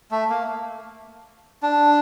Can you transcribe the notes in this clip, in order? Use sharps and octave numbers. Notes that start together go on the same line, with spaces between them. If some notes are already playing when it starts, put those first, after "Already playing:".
A3
A#3
D4